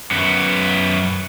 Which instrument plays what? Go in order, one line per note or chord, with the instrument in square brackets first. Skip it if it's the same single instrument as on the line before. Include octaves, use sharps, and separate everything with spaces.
[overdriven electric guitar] F#2 B3